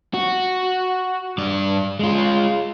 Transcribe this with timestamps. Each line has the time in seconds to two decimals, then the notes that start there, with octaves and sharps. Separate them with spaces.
0.14 F#4
1.38 G2 D5
1.99 G#3 F4